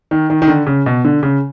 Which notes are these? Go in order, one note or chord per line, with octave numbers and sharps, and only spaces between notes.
D#3
D#3
D#3
D3
C#3
B2
D3
C#3